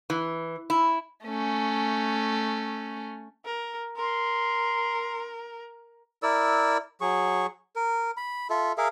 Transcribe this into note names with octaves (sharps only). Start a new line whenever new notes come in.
E3
E4
A3 C#4
A#4
A#4 C6
E4 A#4 D5 E6
F#3 G#4 C#6
A#4
B5
F4 A4 E5
G#4 A#4 E5 F5